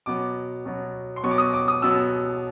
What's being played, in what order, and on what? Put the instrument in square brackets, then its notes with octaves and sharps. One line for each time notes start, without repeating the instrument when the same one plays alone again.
[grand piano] B2 F#3 B3 D6
B2 F#3 B3
C6
B2 F#3 B3 C#6
D6
D#6
D6
D#6
B2 F#3 B3 E6